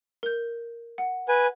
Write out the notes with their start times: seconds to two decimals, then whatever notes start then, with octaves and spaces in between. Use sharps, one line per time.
0.23 A#4 G6
0.98 F#5
1.28 B4 G#5